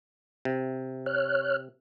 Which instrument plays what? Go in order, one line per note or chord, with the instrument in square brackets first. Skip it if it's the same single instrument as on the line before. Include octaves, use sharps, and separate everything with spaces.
[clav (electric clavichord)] C3
[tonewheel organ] C#5 F6 F#6